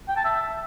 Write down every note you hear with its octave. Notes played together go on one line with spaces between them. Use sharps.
G5
A5
E5